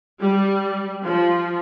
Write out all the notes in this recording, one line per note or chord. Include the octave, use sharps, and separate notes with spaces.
G3
F3